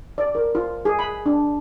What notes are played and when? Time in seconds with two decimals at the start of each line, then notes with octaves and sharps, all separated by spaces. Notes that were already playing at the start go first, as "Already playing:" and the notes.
0.18 D5
0.35 A#4
0.55 F4
0.85 G#4
0.99 B5
1.26 D4